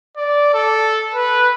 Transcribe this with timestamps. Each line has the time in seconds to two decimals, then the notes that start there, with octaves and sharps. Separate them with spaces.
0.17 D5
0.54 A4
1.14 B4